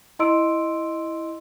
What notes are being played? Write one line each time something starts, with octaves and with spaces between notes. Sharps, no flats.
E4 D#5 C6 E6 D7